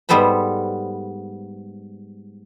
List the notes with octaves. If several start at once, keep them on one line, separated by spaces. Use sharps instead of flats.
G#2 G3 B3 A4 C5 B5